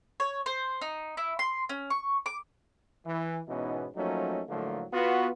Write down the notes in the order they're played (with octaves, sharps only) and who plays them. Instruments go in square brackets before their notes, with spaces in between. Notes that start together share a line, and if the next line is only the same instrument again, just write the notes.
[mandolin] C#5
C5
D#4
E4
C6
C#4
C#6
D6
[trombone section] E3
G#2 B2 E3 B3 C#4 D#4
F3 F#3 A3 A#3 C#4 D#4
A2 D3 F3 F#3 A3 A#3
B3 F4 F#4